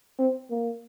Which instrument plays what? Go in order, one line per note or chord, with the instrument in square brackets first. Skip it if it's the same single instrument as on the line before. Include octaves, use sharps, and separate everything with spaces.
[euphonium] C4
A#3